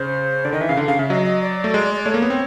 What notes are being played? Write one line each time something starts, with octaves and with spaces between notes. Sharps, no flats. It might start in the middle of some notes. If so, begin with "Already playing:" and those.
Already playing: C#3 C5
D3 D5
D#3 D#5
E3 E5
C#3 F5
D3
C#3 F5
C#3 E5
F#3 D#5
D#5
D5
A3
G#3
D5
A3 C#5
A#3
B3
C4